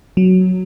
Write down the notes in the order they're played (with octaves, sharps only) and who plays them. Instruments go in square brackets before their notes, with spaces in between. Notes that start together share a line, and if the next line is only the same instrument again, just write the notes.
[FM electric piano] F#3